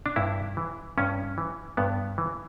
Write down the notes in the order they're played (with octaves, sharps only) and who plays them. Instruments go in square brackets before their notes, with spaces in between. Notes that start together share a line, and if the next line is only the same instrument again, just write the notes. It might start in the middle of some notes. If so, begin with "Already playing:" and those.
[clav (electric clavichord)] D4
G2 E4
E3
G2 C#4
E3
G2 B3
E3